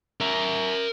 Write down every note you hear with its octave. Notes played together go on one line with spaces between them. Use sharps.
A#4 E5